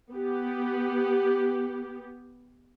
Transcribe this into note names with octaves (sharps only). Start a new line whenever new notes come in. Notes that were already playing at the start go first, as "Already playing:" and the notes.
B3 G4